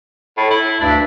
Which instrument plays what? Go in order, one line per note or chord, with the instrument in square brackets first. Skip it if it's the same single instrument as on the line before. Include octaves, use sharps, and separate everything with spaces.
[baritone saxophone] A2
E4
[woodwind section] D2 G2 E5 [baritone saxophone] D4